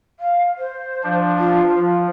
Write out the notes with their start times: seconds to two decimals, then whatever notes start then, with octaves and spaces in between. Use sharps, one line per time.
0.20 F5
0.58 C5
1.03 F3 D4
1.37 F4
1.76 F3